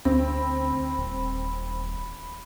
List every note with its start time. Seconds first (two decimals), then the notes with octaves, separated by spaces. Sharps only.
0.05 D2 C4 B5
0.98 D#1